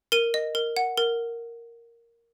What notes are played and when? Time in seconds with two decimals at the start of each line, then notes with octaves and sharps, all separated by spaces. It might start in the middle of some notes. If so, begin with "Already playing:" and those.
0.12 A#4 D#7
0.34 D#5
0.55 A#4
0.76 F#5
0.97 A#4